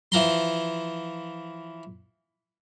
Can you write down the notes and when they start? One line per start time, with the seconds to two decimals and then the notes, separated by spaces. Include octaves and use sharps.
0.12 E3 F3 A#5 C6